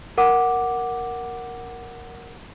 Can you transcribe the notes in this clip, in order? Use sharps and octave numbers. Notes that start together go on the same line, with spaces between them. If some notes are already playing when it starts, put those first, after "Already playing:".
A#4 F#5 D6